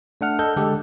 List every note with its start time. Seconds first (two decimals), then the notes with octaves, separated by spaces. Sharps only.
0.21 A3 D4 F#5 F6
0.39 A4 D#5 G6
0.57 D3 G#3 G4 A4